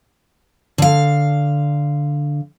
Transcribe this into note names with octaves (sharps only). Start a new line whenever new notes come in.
D3 F5